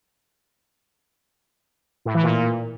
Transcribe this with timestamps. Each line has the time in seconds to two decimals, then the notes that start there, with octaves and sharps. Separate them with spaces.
2.05 A2
2.14 E3
2.23 A#2